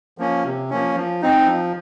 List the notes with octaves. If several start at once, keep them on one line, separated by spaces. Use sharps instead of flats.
F3 A#3 C#4
C3
F3 A#3 C#4
F3
C4 D#4
F3